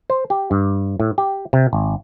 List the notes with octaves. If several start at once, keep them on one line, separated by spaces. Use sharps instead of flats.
C5
G4
G2
A2
G4
C3
G#1